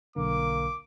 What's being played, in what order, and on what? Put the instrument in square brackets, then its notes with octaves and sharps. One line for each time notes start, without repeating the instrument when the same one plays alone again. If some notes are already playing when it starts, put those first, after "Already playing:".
[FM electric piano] B1 D3 [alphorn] A#3 [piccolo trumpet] D6